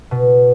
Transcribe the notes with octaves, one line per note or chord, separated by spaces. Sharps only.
B2